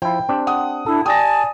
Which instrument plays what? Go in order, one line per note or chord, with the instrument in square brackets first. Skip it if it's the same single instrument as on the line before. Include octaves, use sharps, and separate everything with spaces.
[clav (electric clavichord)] F3 E4 [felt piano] G5
[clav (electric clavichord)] C4 D4 G4
[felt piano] F#5 D#6
[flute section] D4 E4 [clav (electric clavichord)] A4
[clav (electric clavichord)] G4 [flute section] D5 G#5 A5 [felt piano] D#6 A#6